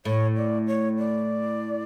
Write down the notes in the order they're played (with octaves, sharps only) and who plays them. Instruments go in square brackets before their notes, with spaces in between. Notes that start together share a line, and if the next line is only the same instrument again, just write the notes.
[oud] A2 [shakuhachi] C#5
[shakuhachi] D5
C#5
D5